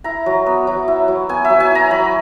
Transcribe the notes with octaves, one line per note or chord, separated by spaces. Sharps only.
E4 A#5
F#3
B3
F#3
E4
F#3
B3 G#5
E5
F#3
G#5
E4 A#5
F#3 B5